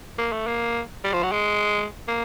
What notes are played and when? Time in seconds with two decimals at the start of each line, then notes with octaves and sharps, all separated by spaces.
0.18 A#3
0.32 A3
0.47 A#3
1.04 G3
1.13 F3
1.23 F#3
1.32 G#3
2.08 A#3